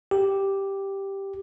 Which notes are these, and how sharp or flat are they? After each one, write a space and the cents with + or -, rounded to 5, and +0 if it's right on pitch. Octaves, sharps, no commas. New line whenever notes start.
G4 +0